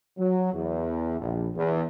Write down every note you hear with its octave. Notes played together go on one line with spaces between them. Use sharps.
F#3
E2
A#1
E2